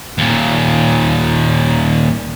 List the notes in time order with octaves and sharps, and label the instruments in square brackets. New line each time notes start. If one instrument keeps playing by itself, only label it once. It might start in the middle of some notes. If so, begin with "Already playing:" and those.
[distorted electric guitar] D#2 A#2